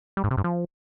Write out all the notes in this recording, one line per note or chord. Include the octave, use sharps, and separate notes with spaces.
G3
G#2
C3
G2
F3